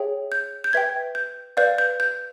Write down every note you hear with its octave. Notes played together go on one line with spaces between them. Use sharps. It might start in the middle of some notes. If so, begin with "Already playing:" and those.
Already playing: G#4 C#5 E5 G5
G6
G6
B4 E5 G5 G#6
G6
B4 D5 F5 G6
G6
G6